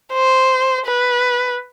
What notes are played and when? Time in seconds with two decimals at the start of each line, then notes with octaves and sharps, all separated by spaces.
0.13 C5
0.86 B4